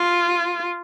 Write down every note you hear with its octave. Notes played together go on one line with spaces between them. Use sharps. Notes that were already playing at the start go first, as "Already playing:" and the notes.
Already playing: F4